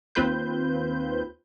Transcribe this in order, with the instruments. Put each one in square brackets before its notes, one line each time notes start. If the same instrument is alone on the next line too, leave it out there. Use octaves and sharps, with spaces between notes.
[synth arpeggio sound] D#2 C4 F4 B4 C5 G6